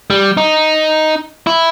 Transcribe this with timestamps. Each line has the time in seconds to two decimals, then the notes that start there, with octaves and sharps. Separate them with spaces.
0.10 G3
0.37 D#4
1.47 E4